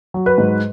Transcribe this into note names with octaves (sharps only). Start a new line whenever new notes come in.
F#3
B4
G#2